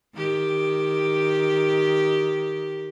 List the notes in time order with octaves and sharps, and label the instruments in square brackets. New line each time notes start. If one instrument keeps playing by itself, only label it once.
[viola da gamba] D#3 G4